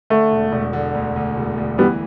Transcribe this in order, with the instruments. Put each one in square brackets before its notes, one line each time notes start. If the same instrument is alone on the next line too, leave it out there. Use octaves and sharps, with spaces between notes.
[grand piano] D3 [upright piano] A3
[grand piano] E1
E1
D3
D2
D2
E1
D2
[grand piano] E3 [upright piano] G3 B3